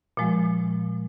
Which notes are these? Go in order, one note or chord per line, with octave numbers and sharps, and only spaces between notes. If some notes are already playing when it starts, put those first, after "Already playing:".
A#2 F3 G#3